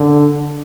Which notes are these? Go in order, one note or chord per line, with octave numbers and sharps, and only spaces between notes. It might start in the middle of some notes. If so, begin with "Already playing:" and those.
Already playing: D3